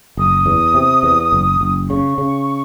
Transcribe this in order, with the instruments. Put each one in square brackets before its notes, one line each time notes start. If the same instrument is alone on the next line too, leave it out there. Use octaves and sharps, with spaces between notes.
[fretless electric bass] F#1 [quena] D#6
[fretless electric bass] E2
C3
E2
F#1
F#1
[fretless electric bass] C#3 [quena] C#6
[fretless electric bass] C#3